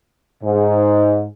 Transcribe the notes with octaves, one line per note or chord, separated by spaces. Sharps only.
G#2